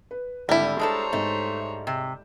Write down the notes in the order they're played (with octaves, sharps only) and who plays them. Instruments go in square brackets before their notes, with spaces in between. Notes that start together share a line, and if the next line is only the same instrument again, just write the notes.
[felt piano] B4
[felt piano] G#1 [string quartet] D3 [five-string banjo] G3 E4
[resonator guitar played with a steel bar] G#3 D4 A4 [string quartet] C5 C#5 A#5 [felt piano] A5
[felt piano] G#2 G#3 [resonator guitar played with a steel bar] A3
[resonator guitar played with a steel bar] C3